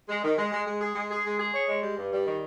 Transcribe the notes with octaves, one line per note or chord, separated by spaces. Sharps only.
G#3
D#3
G#3
G#3
G#3
G#4
G#3
G#4
G#3
G#4
C#5
G#3
G3
G2
G3
D#3